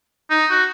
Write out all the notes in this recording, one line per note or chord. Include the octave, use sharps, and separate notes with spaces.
D#4
F#4